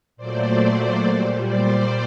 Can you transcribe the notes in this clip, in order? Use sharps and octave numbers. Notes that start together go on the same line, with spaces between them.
A#2 F#3 A3 C5 D5
C5 D5
A#2 G3
C5 D5